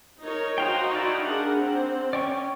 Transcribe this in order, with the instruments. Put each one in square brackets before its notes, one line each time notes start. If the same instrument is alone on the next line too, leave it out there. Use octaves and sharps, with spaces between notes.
[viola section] D#4 A#4 C#5
[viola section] D#4 F#4 [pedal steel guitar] C5 F5 G5
[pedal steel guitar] E4 D5 F5
[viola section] D4 G#4 A#4 [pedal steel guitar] F#5
[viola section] C4
[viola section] C#4 [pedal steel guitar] D5 G5 C#6